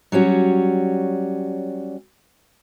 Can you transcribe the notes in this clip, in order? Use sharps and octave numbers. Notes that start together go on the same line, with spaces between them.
F#3 G3 C#4 F#4